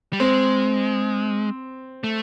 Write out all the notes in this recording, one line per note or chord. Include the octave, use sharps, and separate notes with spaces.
G3
G#3 C4
A3